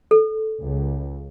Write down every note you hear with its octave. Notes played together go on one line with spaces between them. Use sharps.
A4
C#2